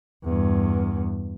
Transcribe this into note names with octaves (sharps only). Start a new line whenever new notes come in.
E2 G2